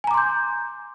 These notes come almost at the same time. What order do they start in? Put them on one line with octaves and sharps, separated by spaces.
G#5 A#5 D6 C6 G6